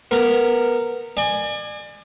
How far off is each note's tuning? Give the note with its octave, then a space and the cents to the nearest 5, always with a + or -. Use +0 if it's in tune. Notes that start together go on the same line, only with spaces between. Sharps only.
B3 -10 A#4 -10
D5 +40 G#5 +0